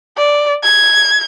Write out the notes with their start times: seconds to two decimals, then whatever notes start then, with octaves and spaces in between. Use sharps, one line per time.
0.17 D5
0.63 G#6